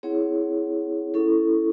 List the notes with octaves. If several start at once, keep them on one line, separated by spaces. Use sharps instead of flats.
C4 E4 G#4 C#5 F#5
C#4 E4 A4